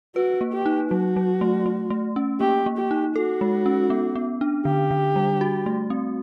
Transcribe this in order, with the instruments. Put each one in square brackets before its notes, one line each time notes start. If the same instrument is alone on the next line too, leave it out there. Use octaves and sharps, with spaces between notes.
[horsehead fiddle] F#4 [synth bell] B4
[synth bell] A#3
[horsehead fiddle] G4
[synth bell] D#4
[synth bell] F#3 [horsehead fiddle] F#4
[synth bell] F#3
A3
A3
A3
C#4
[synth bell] A#3 [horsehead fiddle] G4
[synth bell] A#3
[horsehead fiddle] G4
[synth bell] D#4
[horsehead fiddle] F#4 [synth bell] A4
[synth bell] G#3
C#4
B3
B3
D4
[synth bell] D3 [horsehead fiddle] G4
[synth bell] D3
G3
F#4
A3
C4